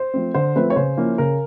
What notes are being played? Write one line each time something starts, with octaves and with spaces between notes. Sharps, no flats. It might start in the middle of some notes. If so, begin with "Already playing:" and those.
Already playing: C5
F3 A3 C4
D3 C5
F3 A3 C4 B4
C#5
C#3 C5
F3 A#3 C#4 E4
C#3 A#4